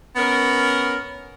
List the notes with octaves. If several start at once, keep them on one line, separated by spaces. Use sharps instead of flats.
B3 C#4 A#4